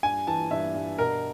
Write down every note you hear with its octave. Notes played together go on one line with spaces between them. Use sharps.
G2 G#5
E3 A5
G2 E5
G2
B2 A#4